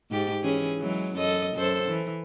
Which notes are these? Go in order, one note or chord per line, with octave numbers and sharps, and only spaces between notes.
G#2 G4
E3 C#4 G#4
E3 F#3 G#3
F#2 A4 D#5
F#2 A4 C5
E3